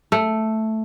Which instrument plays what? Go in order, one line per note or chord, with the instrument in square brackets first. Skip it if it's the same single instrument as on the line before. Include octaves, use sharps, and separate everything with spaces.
[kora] A3